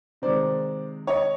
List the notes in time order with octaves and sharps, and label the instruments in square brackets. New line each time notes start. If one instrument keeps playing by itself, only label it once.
[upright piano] C3 D#3 G#3 C5 D5
C#5 D#5